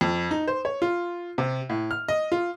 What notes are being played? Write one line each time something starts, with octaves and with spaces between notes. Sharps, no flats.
F2
D#4
C5
C#5
F4
C3
A2
F6
D#5
F4